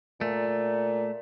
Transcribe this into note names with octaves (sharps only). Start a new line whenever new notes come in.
A#2 A3